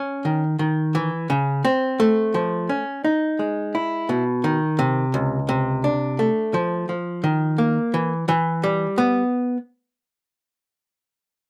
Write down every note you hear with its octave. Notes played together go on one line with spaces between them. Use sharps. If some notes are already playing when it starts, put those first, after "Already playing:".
Already playing: C#4
D#3
D#3
E3
C#3
C4
A3
F3
C#4
D#4
G#3
E4
B2
D#3
C3
C#2
C3
D4
A3
F3
F3
D#3
A#3
E3
E3
G3
B3